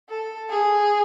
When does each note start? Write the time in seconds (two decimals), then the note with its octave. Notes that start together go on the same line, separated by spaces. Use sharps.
0.09 A4
0.50 G#4